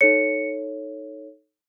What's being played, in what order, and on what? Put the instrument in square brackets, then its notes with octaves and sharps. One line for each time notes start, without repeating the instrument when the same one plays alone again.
[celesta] D#4 A4 C#5 C#7